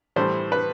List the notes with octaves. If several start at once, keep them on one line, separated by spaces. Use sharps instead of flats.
A2 E3 G3 C5
B4